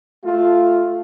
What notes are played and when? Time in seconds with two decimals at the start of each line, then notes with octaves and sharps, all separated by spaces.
0.25 A3 F4